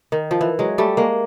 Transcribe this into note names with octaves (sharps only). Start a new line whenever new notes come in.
D#3
F3
E3
F#3 G#3
G3 A3
G#3 A#3